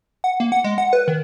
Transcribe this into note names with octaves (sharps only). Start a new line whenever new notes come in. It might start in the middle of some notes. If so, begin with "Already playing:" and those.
F#5
A#3
F#5
G#3
F#5
B4
D#3